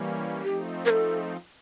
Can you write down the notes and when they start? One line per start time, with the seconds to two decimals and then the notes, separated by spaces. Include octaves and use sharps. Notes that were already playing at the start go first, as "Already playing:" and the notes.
Already playing: E3 G3 A#3 C#4
0.43 F3 A3 C4 D#4 G4
0.85 A#4
0.90 A4